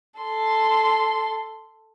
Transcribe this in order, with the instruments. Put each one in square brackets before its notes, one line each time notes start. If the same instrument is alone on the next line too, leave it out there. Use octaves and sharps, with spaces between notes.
[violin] A4 C6